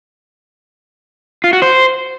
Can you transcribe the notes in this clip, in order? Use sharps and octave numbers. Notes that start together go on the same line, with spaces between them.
F4
F#4
C5